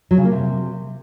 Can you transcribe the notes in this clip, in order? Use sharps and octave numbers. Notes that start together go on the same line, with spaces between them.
F#3
C#3
A#3
C3